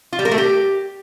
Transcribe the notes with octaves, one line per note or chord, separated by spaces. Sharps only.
F4
G3
A#4
A3
G4